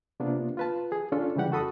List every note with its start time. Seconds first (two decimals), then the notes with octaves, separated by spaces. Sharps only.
0.20 C3 A#3 B3 D4 F4
0.57 F4 B4 A5
0.92 G#4
1.12 C#4 D4 F4 A4
1.36 C#3 E3 G3 G4 F#5
1.51 F2 F#4 A4 B5 D#6